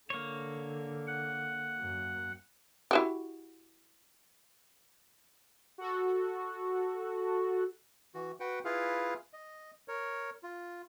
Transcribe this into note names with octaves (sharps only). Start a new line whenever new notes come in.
D3 A#3 C#5
F#5
F#2
E4 F#4 G4
F#4 A4
E3 F#4
F#4 B4 F#5 G5
E4 F4 G#4 B4 F5
D#5
A#4 C#5
F4